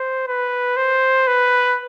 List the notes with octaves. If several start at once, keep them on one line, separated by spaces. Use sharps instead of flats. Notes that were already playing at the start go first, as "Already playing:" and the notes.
Already playing: C5
B4
C5
B4